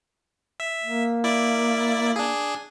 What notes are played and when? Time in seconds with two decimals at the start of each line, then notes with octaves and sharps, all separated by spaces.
0.60 E5
0.84 A#3
1.24 E4 D5
2.16 D4 G#4